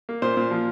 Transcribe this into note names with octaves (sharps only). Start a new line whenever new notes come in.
A#3
A#2 C5
A#2
F3